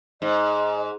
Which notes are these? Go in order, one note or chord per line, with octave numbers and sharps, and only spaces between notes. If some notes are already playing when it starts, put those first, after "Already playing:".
G#2 D#5